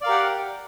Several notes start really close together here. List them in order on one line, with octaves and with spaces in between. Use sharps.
D5 F5 A#4 G4 F#5